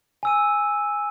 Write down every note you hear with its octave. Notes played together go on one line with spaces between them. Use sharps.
G#5 E6 D#7